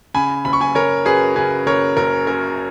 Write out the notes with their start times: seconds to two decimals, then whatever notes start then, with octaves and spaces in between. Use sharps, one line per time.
0.14 C#3 G#5 B5
0.45 F#1 B5
0.53 C#6
0.61 G#5 B5
0.75 F#1 A#4 C#5
1.05 F#2 G#4 B4
1.36 C#3 G#4 B4
1.67 F#1 A#4 C#5
1.97 F#1 A#4
2.27 F#2 A#4